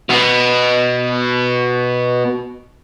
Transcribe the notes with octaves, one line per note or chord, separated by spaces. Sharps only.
B2 B3